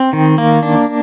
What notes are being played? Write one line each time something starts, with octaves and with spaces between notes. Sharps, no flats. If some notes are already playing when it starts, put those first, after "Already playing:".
Already playing: C4
D#3
A#3
D4